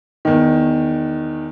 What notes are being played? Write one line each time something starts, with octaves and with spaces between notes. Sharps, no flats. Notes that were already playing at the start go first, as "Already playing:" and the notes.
E2 D#3